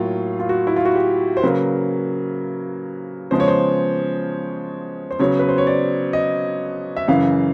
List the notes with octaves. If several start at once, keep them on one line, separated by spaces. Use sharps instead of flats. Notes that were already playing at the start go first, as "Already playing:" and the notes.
Already playing: A2 F#3 A#3 F4
F4
F#4
E4
F4
F#4
G4
C5
C#3 F#3 A#3 B4
C#3 F3 G#3 B3 C5
C#5
C5
C5
C#3 F#3 B3 C#5
B4
C5
C#5
D5
D#5
E5
F#2 C#3 E3 F5